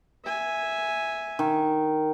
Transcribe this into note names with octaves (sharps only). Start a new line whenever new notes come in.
E5 G#5
D#3